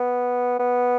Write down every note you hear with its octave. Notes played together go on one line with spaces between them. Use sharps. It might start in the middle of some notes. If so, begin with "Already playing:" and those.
Already playing: B3
B3